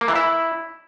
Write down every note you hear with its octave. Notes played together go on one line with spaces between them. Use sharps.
A#3
E3
E4